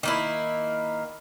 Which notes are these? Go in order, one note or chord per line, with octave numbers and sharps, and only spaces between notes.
D#3 A#3 E4